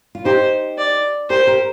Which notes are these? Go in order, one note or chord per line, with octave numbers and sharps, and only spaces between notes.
F4
D#4 G4 C5
D5
G4 A#4 C5
G4 A#4